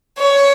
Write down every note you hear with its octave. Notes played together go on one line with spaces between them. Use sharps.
C#5